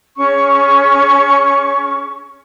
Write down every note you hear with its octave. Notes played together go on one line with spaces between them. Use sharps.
C#4 G#4 C#6